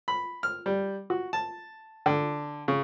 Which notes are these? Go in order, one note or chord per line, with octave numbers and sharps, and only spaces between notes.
B5
F6
G3
F#4
A5
D3
C#3